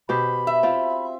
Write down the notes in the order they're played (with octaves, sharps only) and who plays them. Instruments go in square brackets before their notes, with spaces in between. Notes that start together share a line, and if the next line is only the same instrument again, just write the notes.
[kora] B2 G4 C5 [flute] B5
[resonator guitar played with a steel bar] E5
[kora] C4 F4